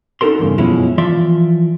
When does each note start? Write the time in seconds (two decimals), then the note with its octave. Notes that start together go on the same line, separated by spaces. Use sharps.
0.21 C#4 D#4 F#4 A4 A#4 C6
0.39 E2 G2 C#3
0.58 F#2 B2 F3 G#3 C#4 E4
0.98 E3 F3 F4 D5 E5 C6